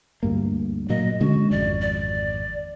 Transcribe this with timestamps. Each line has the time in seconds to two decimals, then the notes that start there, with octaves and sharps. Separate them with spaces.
0.23 D2 G2 A#3
0.89 A#2 F#3 A#3 D#5
1.21 D3 G#3 C#4 F#4
1.51 G#1 F2 D5
1.81 D5